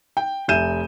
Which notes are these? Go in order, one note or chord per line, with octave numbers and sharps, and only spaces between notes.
G5
F1 E5 G#5 G6 D#7 E7